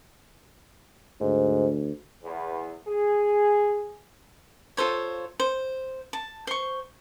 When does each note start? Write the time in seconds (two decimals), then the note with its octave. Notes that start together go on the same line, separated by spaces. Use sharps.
1.21 D2 G#2
2.23 E2
2.88 G#4
4.77 F4 A4 C5 C#5
5.40 C5
6.13 A5
6.47 C5 C#6